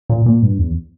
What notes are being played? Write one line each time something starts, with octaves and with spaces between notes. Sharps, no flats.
A#2
A#2
G2
E2